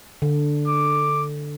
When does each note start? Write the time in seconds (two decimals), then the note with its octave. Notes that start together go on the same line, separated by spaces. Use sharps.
0.22 D3
0.68 D6